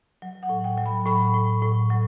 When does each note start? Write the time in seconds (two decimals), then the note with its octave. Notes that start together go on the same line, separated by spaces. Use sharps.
0.22 F#3
0.43 F#5
0.49 A2
0.64 G5
0.77 F#3
0.86 B5
1.06 A2 B5
1.34 A2
1.62 A2
1.90 F#3